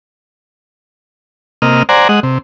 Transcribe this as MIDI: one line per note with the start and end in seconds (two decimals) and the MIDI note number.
1.62 1.83 48
1.62 1.83 58
1.62 1.83 75
1.62 1.83 89
1.89 2.08 72
1.89 2.08 74
1.89 2.08 78
1.89 2.08 80
1.89 2.08 82
2.09 2.20 56
2.09 2.20 75
2.09 2.20 78
2.23 2.38 48